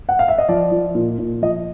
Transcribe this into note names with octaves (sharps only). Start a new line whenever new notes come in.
F#5
F5
E5
D#5
F3 D5
F3
A#2
A#2
F3 D#5